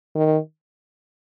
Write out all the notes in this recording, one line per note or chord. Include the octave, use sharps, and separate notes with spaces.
D#3